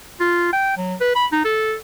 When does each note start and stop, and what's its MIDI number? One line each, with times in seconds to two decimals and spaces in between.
0.20 0.50 65
0.53 0.73 79
0.77 0.95 54
1.01 1.15 71
1.16 1.26 83
1.32 1.40 63
1.44 1.74 69